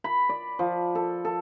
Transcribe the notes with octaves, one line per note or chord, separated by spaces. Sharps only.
B5
D5
F3
A4
A4